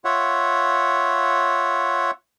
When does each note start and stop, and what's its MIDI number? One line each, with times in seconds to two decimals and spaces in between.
0.05 2.11 65
0.05 2.11 73
0.05 2.11 76
0.05 2.11 78